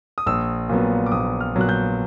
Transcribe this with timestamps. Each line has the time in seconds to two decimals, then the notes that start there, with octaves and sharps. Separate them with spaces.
0.18 D#6
0.26 A#1 E6
0.69 A#2 F#3 B3
1.06 D6
1.12 A#1 D#6
1.40 F6
1.54 A#2 F#3 B3
1.61 F#6
1.69 G6